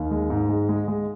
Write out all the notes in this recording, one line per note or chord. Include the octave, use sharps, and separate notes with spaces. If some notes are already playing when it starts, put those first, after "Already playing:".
Already playing: D#2 F5
G#3
G#2
G#3
G#3
G#3